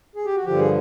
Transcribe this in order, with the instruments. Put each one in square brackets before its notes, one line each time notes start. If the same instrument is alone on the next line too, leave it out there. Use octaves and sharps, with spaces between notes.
[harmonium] G#4
G4
F#4
G2 D3 F3 G4
G#4